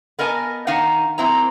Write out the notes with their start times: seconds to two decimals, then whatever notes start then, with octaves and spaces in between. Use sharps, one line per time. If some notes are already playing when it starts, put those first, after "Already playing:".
0.19 B3 A#4 D#5 G#5 A5
0.67 D#3 D#4 F5 F#5
1.18 F#3 A#3 C4 E4 A#5